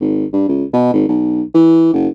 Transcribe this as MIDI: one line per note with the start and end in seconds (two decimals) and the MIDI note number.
0.01 0.25 32
0.33 0.46 43
0.48 0.64 37
0.73 0.91 47
0.93 1.05 32
1.08 1.42 35
1.54 1.93 52
1.93 2.08 30